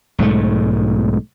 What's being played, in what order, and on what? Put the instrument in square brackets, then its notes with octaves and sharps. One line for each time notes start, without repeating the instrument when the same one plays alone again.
[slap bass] B1 G#2 G#3 A3